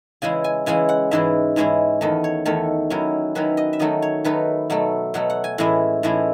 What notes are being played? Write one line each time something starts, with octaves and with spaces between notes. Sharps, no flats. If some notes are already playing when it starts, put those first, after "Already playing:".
C#3 E3 G#3 C#4 E4 G#5
G#5
C#3 E3 G#3 C#4 E4 G#5
F#5
G#2 E3 G#3 C#4 E4 E5
G#2 E3 G#3 C#4 E4
E2 D#3 A3 D#5
C#5
E2 D#3 A3 C#5
D#3 F#3 C#4 E4
D#3 F#3 C#4 E4 B4
D#5
E5
D#3 F#3 A3 D#4 D#5
C#5
D#3 F#3 A3 D#4 B4
B2 F#3 A3
B2 F#3 A3 F#5
F#5
G#5
A2 E3 G#3 C#4 E4 G#5
A2 E3 G#3 C#4 E4